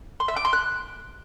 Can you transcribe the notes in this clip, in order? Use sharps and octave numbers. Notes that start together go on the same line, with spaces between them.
C6
E5
D6
C6
F#6